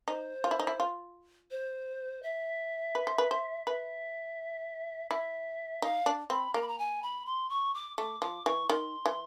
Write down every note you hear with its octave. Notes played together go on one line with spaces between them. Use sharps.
D#4 C5
F4
E4
D#4
E4
F4
C5
E5
B4
C5
B4
C5
B4 E5
E4 E5
D#4 F5
D4
C4 B5
A#3 A#5
B5
A#5
G#5
B5
C6
C#6
D6
A3 D6
F3 D6
E3 C#6
D#3 C6
E3